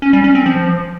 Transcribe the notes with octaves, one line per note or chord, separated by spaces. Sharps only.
C#4
G3
C#4
C4
F3